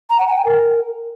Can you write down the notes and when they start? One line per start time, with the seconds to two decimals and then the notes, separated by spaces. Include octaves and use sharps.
0.10 A#5
0.18 F#5
0.27 G#5
0.36 G5
0.45 A#4